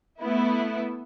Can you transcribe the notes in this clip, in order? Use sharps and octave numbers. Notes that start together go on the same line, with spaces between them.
A3 B3 E4